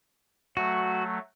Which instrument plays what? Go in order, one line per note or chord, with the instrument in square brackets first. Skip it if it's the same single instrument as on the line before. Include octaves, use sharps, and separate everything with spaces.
[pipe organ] F#3 A3 [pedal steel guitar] F#4